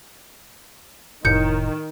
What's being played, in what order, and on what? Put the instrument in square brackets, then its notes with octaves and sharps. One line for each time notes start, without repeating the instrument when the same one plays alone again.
[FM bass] F1 [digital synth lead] A2 [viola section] D#3 [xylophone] G6 C#7